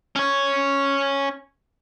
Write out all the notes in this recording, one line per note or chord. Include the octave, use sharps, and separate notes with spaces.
C#4 C#5